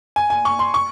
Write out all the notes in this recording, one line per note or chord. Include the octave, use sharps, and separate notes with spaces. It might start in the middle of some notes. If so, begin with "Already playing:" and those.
G#5
G#5
C#6
C6
C#6